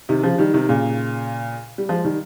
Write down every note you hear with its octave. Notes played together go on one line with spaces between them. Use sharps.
C3 D#3
C#3 F3
D#3 G3
C3 D#3
A#2 C#3
G3
F3 G#3
D#3 G3